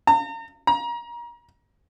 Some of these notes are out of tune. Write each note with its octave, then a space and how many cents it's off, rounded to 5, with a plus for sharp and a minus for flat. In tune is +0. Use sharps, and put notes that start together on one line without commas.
A#5 -40
A#5 +30